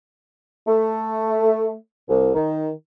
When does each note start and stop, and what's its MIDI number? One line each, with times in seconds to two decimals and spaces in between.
0.67 1.74 57
2.09 2.30 36
2.35 2.69 51